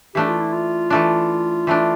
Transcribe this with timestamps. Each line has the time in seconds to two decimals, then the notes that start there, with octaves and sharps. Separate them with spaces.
0.15 E3 A3 D4 G4
0.28 F4
0.40 E4
0.52 F4
0.90 E3 A3 D4
1.67 E3 A3 D4